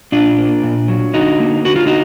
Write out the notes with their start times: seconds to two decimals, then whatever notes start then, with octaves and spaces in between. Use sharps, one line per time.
0.12 A#2 D4 F4
0.38 A#3
0.63 A#2
0.88 F#3
1.14 D3 D#4 F#4
1.40 A#3
1.65 D3 F#4
1.76 F4
1.87 D#4 F#4